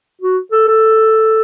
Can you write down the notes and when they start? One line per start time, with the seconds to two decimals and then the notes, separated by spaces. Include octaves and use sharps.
0.21 F#4
0.52 A4
0.68 A4